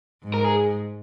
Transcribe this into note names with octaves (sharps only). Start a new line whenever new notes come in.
G#2
A#4
G#4